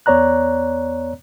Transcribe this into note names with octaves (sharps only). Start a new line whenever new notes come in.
E2 B3 C#5 D5 A#5 F#6